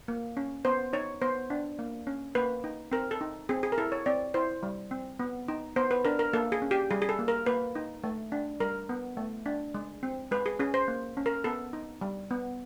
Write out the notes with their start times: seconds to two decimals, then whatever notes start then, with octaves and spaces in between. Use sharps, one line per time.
0.08 A#3
0.37 C#4
0.65 B3 C5
0.93 D#4 C#5
1.22 B3 C5
1.50 D4
1.79 A#3
2.07 C#4
2.35 A#3 B4
2.64 D#4
2.92 C4 A#4
3.11 A4
3.21 D#4
3.49 C4 G#4
3.63 G#4
3.72 A#4
3.78 E4 A4
3.92 C#5
4.06 C4 D5
4.34 E4 C5
4.63 G3
4.91 C4
5.19 B3
5.48 D#4
5.76 B3 C5
5.91 B4
6.05 D4 A#4
6.19 A#4
6.33 A#3 A4
6.52 G#4
6.62 C#4
6.71 G4
6.91 G3 G#4
7.02 G#4
7.09 A4
7.19 A#3
7.28 A#4
7.46 A#3 B4
7.75 D#4
8.04 A3
8.32 D4
8.60 G3 A#4
8.89 B3
9.17 A3
9.46 D4
9.74 G#3
10.03 C4
10.31 G#3 B4
10.46 G#4
10.59 C#4 G#4
10.74 C5
10.88 A#3
11.17 C#4
11.26 A#4
11.44 B3 A4
11.73 D#4
12.01 G3
12.31 B3